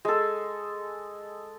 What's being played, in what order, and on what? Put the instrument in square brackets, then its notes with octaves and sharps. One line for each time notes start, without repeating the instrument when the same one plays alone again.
[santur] G#3 A4